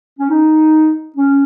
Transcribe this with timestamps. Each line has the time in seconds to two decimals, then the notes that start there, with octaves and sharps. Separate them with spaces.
0.19 C#4
0.30 D#4
1.17 C#4